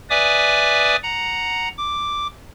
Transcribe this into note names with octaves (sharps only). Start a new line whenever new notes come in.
B4 D5 E5 G#5 D6 D#6
F#5 A#5
D6